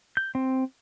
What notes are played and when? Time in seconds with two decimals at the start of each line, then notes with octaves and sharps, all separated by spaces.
0.17 G6
0.35 C4